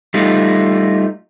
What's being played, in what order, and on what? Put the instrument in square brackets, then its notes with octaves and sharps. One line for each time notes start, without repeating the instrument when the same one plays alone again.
[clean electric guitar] G3 A3 D#4 F4